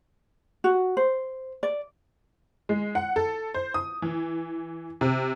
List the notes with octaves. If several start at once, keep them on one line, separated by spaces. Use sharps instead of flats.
F#4
C5
D5
G#3
F#5
A4
C5
D#6
E3
C3